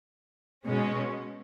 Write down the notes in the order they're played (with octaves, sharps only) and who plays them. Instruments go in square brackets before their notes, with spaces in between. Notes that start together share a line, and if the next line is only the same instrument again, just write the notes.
[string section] B2 G#3 C#4